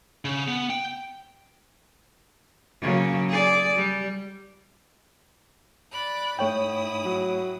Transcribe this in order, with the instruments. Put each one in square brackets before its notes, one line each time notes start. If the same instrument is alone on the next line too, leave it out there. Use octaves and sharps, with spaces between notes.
[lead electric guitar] C#3
B3
G5
[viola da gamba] C#3 F#3 A#3
G#4 D5
G3
[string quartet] D5 B5 F#6
[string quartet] G#2 E4 D#6 [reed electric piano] A3 C#5 G5
[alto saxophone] F#3